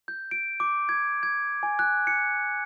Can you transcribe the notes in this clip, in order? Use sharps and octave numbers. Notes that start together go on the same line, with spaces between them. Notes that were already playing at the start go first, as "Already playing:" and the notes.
G6
D7
D6
G#6
G#6
G#5
F#6
C#7